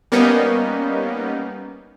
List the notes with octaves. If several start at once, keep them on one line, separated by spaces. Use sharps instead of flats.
G3 A#3 B3 C#4 D#4